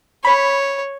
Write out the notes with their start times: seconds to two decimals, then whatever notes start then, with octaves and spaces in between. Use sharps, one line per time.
0.25 C#5 B5